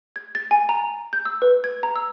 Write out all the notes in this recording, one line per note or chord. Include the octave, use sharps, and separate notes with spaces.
G#6
A6
G#5
A#5
G6
E6
B4
G#6
A#5
E6